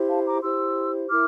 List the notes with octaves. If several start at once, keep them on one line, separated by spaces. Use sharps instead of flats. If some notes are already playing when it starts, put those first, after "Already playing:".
Already playing: E4 G4 C5
F5 A5
A#5 D6
E4 G4 C5 C6 E6
E4 A#4 D6 F6